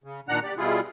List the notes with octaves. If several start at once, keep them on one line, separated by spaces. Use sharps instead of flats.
C#3
A#2 D#3 D4 F#5 A#5 F#6
G4 D5
B2 G3 E4 F4 G#4